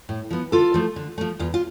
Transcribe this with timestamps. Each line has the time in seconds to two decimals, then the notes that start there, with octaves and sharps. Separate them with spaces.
0.09 A2
0.30 F3 B3
0.52 D3 F4 A4
0.74 F3 A3
0.96 D3
1.18 F3 A3
1.39 E2 F4
1.54 F4